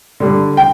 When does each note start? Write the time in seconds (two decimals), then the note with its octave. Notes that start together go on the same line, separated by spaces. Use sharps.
0.20 D3 G3
0.57 G5